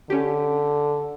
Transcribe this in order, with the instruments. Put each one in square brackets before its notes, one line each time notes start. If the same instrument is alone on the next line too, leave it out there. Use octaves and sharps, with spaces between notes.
[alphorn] D3 [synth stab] C#4 G4